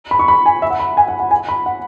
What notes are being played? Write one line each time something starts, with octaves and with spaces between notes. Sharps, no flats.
B5
C#6
B5
G#5
E5
F#5
B5
G#5
F#5
F#5
G#5
B5
F#5